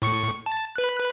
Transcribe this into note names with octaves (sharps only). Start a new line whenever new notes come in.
A2 C#6 C#7
A5
B4 F#6